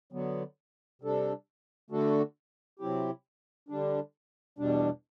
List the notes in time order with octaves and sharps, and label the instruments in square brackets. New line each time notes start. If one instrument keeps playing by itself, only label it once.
[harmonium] D3 F#3 B3
C3 G3 D4 A4
D3 A3 D4 F#4 A4
C3 F#3 C4 E4 G4
D3 G3 D4
E2 B2 G3 D4